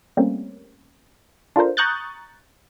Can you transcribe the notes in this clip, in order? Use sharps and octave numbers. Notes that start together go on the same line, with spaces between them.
G3 A3 A#3 C4 C#4
D4 F4 A4 A#4 C5
A#5 C#6 D#6 F#6 G6 A6